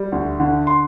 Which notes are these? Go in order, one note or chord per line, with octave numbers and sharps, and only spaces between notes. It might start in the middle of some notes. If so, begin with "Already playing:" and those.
Already playing: G3
D2
D3
C6